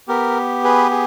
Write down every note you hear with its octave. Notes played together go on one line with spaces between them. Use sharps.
B3 G4 A#4
G#4 B4
G#4